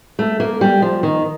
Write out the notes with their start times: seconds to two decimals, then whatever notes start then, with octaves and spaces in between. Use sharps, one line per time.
0.19 A3
0.40 A#3
0.61 G3
0.82 F3
1.03 D#3